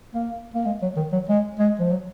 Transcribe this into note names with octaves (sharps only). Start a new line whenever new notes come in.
A#3
A#3
G#3
F#3
D#3
F#3
G#3
G#3
F3
F#3